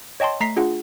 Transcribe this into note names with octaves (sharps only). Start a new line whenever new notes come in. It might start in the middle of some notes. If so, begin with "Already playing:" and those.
C#5 D#5 G5 A5 C6
A3 A#5 B6 C7
D4 F4 G#4 F#5